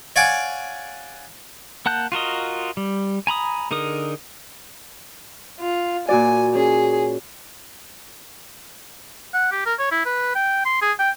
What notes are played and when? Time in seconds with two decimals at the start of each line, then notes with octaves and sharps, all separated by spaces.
0.16 C#5 D5 F5 F#5 G#5 D6
1.86 A#3 F#5 A5 F#6 G6
2.12 F4 F#4 A#4 D#5
2.77 G3
3.27 G#5 A#5 B5 D#6
3.71 D3 D#4 G#4 A#4 D#6
5.61 F4
6.09 A#2 F#4 D5 G#5
6.55 C#4 G#4
9.34 F#5
9.52 G4
9.66 A#4
9.79 C#5
9.91 E4
10.06 B4
10.35 G5
10.65 C6
10.82 G#4
10.99 G5